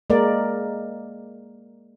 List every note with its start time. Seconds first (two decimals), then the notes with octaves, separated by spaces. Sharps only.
0.10 G#3 A#3 A#4 D5